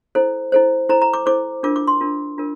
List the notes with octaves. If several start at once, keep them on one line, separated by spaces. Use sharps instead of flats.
E4 A4 C5
E4 A4 C5
E4 A4 C5 A#5
A#5
D6
E4 A4 C5 D6
D4 F4 A#4 D6
D6
C6
D4 F4 A#4
D4 F4 A#4